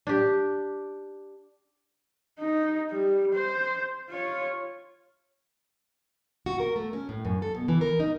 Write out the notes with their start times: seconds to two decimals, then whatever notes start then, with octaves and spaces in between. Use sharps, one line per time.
0.07 D4 G4
2.39 D#4
2.91 G3
3.34 C5
4.10 F4 C#5
6.46 F#4
6.60 A#4
6.76 A3
6.93 C#4
7.09 A2
7.25 F#2
7.42 A4
7.55 B2
7.68 E3
7.81 A#4
8.00 D#4